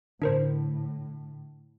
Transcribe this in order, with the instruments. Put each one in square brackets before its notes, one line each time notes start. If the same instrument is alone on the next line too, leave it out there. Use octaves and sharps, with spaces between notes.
[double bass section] A2 [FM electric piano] D3 [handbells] D4 A#4 C5